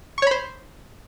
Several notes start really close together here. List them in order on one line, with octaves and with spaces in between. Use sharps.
C#6 C#5 B5 C5